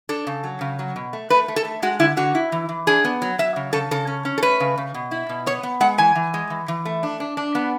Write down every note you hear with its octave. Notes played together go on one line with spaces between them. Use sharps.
D4 A4
C#3
F#3
C#3
F#3
B2
A3
A3 B4
A3
A4
A3
G#3 F#4
D3 E4
D3 F#4
E4
E3
E3
D4 G#4
B3
F#3
F#3 E5
C#3
C#3 A4
C#3 A4
C#4
C#4
A4
A3 B4
C#3
C#3
B2
E4
B2
B3 C#5
B3
G#3 F#5
E3 G#5
E3
G#3
E3
E3
A3
D4
D4
D4
B3